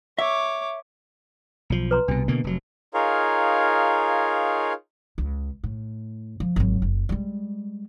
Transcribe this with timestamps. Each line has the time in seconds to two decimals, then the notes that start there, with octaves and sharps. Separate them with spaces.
0.19 C#5 E5 D6
1.70 B1 F3
1.91 B4 A#5 C6
2.08 C2 B2 D4
2.28 B2 D3 A#3
2.44 F1 F#3
2.94 D#4 F4 G#4 A#4 C#5 F5
5.18 C#2
5.64 A2
6.40 F3
6.56 G#1 F#3
6.82 F#1
7.09 G3 G#3